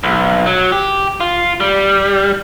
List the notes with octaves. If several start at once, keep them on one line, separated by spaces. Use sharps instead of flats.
B1
F#3
G4
F4
G3